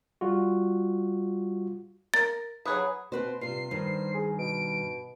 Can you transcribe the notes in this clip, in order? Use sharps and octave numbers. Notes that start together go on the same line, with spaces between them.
G3 F4 F#4
A#4 A6
F#3 G#4 B4 B5 D#6 F#6
B2 C4 B4 C5
G2 C3 F4 C7
G2 D#3 C5
G#4
B2 D7